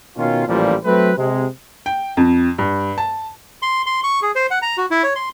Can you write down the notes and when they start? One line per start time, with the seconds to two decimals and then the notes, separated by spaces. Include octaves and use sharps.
0.18 B2 D#3 C#4 F4
0.48 A1 A#2 E3 F3 G3
0.85 F#3 A3 C4 B4
1.18 C3 G#3
1.86 G5
2.17 F2
2.58 G2
2.98 A5
3.62 C6
3.86 C6
4.04 C#6
4.22 G#4
4.36 C5
4.51 F#5
4.62 A#5
4.78 F#4
4.91 E4
5.03 C#5
5.16 C6